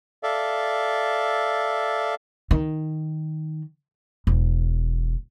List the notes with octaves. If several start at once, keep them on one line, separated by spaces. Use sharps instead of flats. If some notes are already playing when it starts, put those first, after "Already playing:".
A4 D5 E5 F5
D#3
E1